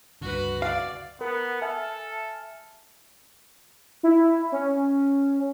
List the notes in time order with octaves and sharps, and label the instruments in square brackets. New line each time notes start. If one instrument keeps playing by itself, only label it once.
[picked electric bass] C#2 G2 D3 [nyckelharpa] F#4 B4
[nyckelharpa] D5 [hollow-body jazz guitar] F5
[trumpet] B3 [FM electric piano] A#4
[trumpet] A4 [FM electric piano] E5 G#5 F6
[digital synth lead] E4
C#4